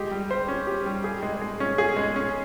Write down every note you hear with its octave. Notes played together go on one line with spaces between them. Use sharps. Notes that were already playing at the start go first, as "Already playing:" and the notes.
Already playing: G#3 G4
G3
C5
C#4
G4
G3
G#4
G#3
G#3
C#4
G#4
G#3
C#4